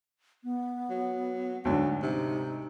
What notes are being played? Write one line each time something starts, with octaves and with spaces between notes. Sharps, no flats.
B3
F#3
D2 G#2 D3 F#3
C3 D#4